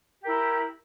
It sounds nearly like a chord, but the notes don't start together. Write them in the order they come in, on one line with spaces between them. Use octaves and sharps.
G4 A#4 E4